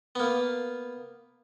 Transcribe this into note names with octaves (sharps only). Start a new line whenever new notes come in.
A#3 B3